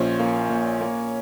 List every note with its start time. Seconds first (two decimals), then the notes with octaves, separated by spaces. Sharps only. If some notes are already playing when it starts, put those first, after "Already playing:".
Already playing: A#1 A#2 F3 C#4 C5 C#5
0.19 A#3
0.50 A#2
0.81 A#3